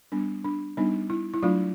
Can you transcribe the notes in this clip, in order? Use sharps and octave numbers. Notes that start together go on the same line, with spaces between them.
G3 B3 D4
D4
G3 B3 D4 D#4
E4
E4
F#3 A3 D4 F4